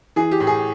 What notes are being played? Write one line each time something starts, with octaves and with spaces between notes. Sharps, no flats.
E3 G#4
G4
A2
G#4